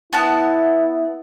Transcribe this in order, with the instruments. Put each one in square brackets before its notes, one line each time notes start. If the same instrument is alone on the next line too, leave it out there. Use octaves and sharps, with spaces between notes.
[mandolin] B3 A5 F#6 [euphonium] E4